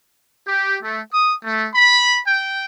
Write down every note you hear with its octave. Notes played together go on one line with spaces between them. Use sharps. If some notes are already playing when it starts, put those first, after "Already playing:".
G4
A3
D#6
A3
B5
G5